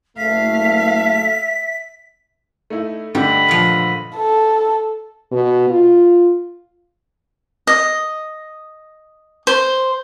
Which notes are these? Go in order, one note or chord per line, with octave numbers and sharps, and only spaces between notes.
F#1 A3 E5 F5 B6
A3 D#4 E4
G2 D3 G3 A3 G4 D#5 B5
A#2 F3
A4
B2
F4
D#5
C5